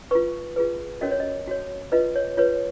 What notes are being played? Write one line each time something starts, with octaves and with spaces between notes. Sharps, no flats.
F4 B4 C#6
F4 G#4 B4
C#4 F#4 A#4 C#5 D#5
C#5
D#5
F#4 C#5
F4 B4 D#5
C#5
F4 B4 C#5